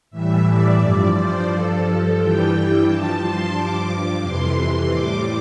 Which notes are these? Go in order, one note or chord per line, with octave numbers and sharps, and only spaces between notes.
A2 E3 G3 E5
D5
G2 F3
C5
G2 F3 A4
G2 E3 G3 G5
G2 F3 A5
C6
G2 F3 D6
F2 C3 E3 C6
A2 G3 D6